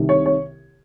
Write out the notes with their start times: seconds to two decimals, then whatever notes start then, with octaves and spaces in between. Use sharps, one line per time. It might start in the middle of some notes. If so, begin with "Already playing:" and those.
Already playing: C2 C3 D#3
0.09 C#5
0.26 C#5